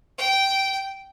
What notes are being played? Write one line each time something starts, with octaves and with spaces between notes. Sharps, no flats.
G5